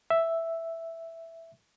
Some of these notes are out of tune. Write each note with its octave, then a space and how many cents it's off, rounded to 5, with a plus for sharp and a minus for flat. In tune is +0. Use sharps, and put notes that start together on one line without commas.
E5 +0